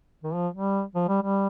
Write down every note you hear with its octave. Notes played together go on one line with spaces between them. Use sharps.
D#3
F3
G3
F3
G3
G3